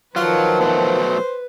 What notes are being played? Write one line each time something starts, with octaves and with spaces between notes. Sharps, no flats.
D#3 F3 F#3 F4 B4
B2 F#3 A3 C5